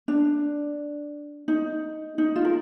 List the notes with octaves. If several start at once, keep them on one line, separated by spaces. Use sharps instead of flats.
D4
D#4
D#4
F4
A#4